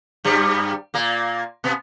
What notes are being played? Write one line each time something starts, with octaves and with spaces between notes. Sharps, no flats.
G2 G3
A#2 A#3
B2 B3